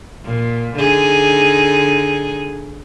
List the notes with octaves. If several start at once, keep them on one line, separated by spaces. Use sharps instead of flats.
A#2
D3 D#4 G#4